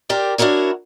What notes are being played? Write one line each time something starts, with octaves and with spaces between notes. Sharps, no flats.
G4 A#4 C5 D5
D4 E4 F#4 A#4 C#5